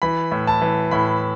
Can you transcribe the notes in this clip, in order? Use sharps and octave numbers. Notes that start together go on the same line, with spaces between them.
E3 B5
A2
A5
E3
A2 B5